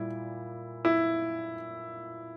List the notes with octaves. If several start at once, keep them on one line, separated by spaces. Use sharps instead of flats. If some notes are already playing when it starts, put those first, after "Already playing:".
Already playing: A#2 G3 E4
E4